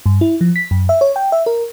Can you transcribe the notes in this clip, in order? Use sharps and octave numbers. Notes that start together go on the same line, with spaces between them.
G2
E4
F3
B6
F#2
E5
C#5
G5
E5
A#4